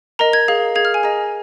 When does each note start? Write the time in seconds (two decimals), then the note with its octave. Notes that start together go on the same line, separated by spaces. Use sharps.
0.19 A#4 D#5 A#5
0.33 G#6
0.48 G#4 F5
0.75 G#4 F5 G#6
0.85 F6
0.94 G#5
1.03 G#4 D#5 A#5